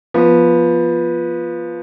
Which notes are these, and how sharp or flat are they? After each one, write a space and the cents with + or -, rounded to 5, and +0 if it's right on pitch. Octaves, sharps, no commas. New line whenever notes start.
F3 +0 B3 -10